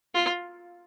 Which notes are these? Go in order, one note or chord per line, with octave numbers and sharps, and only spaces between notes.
F4